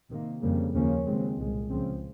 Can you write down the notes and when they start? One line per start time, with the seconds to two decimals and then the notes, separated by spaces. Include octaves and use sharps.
0.10 C3 D#3 A#3
0.43 F2 C#3 G3 A#3
0.74 D#2 C#3 F3 A#3 C#4
1.06 D#2 C#3 G#3 C4
1.38 C2 A#2 G#3
1.69 C#2 C#3 F3 C4